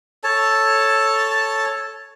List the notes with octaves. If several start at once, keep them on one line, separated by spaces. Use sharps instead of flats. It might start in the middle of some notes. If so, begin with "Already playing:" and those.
A4 C#5 A5